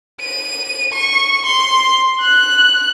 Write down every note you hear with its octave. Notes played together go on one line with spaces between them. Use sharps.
D#7
C#6
C6
F#6